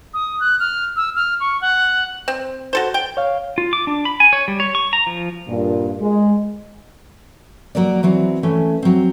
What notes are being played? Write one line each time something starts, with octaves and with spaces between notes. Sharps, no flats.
D#6
F#6
F6
E6
F6
C#6
F#5
C4
F#4 A4 C5
G5
C#5 F5
F4
D6
D4
B5
G#5
C#5
G3
C#5
C#6
A#5
F3
G2 A#2
G#3
F#3 A#3 A#4 D5
E3 F#3 C4
E3 A3 C#4
F#3 C4